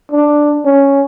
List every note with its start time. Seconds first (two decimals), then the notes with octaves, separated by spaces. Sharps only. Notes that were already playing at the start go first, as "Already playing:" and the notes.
0.12 D4
0.66 C#4